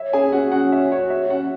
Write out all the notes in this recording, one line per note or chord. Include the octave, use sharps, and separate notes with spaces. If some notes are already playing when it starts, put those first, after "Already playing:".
Already playing: C#5 E5
C#4 G#4 G#5
C#4 F#4 F#5
C#4 F#4 F#5
F#4 E5
F#4 C#5
C#5 E5
C#4 F#4 F#5